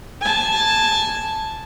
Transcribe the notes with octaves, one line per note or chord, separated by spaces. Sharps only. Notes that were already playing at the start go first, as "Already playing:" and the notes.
G#5 A5